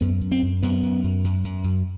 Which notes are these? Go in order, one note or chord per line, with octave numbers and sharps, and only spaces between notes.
F#2 B3
F#2
C4
F#2
F#2 B3
F#2
F#2
F#2
F#2
F#2